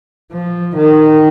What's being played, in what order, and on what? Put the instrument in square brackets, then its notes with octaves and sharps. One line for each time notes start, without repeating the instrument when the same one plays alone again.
[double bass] F3
D#3